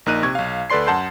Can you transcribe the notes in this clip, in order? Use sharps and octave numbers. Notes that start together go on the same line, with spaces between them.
A#1 A#3 D#4 F#6 D#7
C3 C#6 G#6
B1 F5
D2 A4 B4 D5 C6 C7
F#2 F#5 A5 C6 G6 C7